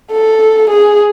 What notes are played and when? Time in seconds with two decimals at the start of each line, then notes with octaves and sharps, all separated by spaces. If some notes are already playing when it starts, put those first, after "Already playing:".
0.12 A4
0.70 G#4